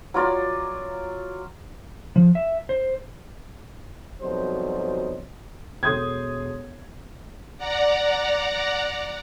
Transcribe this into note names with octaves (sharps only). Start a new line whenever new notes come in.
F#3 F4 D5
F3
E5
C5
F2 B2 F#3 G3 D#4 C5
E1 A4 C6 D#6 G6 G#6
D5 F#5 A#5